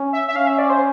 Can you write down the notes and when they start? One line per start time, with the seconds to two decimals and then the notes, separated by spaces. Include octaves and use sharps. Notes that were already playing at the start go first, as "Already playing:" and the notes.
Already playing: C#4
0.13 E5
0.28 E5
0.35 C#4 F5
0.47 E5
0.59 D5
0.70 C5